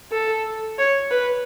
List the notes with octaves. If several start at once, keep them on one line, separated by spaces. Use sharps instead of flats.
A4
C#5
B4